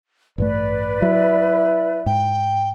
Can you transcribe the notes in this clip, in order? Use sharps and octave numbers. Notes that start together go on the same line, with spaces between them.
A1 G2 A3 B4 D5
F#3 E4
G#2 G5